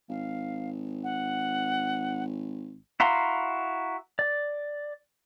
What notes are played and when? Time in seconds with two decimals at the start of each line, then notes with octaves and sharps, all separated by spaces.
0.09 G#1 F5
1.04 F#5
3.00 E4 F#4 F5 A#5 C6
4.19 D5